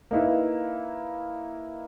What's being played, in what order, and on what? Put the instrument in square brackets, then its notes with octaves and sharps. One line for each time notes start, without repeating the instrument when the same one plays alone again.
[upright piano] A#3 D#4 E4 B4